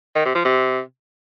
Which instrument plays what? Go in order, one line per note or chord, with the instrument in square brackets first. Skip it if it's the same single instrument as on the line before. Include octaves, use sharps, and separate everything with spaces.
[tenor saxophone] D#3
C3
F3
C3